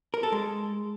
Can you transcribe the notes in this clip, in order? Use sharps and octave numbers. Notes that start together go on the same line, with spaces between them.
A#4
A4
G#3